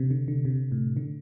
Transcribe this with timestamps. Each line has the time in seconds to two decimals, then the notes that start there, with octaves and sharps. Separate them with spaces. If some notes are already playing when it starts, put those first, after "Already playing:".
Already playing: C3
0.11 D3
0.28 D3
0.45 C3
0.72 A2
0.97 D3